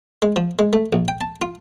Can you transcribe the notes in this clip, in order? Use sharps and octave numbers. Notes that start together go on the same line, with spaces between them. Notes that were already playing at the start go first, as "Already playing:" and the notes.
G#3
F3
G#3
A3
A#1
G5
A5
F4